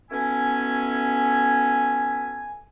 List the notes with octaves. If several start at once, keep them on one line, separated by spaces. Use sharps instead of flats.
B2 A3 B3 C#4 E4 G#5